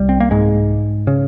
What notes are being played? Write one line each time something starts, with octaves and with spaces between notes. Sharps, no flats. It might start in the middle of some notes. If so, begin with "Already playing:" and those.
Already playing: C2 G3
C4
A#3
G#2 G#3
C#3